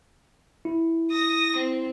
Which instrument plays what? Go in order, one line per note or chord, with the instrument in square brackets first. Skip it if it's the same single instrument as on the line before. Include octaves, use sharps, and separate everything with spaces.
[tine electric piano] E4
[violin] D#6 A#6
C4